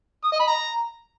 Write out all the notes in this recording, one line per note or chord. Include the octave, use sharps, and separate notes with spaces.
D#6
D#5
B5
A#5